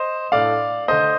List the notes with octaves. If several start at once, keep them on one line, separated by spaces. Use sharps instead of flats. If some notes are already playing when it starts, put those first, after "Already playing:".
Already playing: C5 D#5
A2 A3 D4 D5 F5
D3 A3 D4 C5 D#5